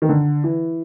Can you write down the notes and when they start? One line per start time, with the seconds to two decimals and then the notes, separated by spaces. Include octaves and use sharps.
0.02 D#3
0.09 D3
0.44 E3